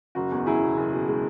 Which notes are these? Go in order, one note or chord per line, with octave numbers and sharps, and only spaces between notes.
F#1 F#4
E2
F#1 E4 G#4
B2
F#1
B2
G#3